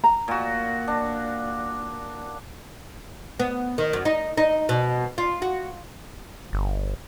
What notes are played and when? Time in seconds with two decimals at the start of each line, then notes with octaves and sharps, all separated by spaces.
0.04 A#5
0.28 A#2 F#4
0.88 D4
3.40 B3
3.78 D#3
3.93 F#2
4.05 D#4
4.37 D#4
4.69 B2
5.18 F4
5.42 F#4
6.53 G1